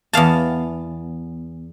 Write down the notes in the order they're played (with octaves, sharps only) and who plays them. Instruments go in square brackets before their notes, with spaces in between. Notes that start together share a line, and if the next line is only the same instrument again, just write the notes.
[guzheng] E2 B3 F5 A5